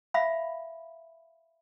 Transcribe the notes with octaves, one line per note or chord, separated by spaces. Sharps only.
E5 F5 B5